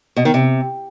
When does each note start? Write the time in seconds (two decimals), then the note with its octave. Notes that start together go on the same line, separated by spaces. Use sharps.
0.17 B2
0.25 D#3
0.34 C3